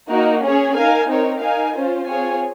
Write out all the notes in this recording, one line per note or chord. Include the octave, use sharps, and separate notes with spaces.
A#3 D#4 F#4 A#4
C#4 G#4 C#5
D#4 A#4 F5 G#5
C4 D#4 A#4 C#5
D#4 A#4 F5 G#5
C#4 F4 C5
C4 F4 G#4 C#5 G#5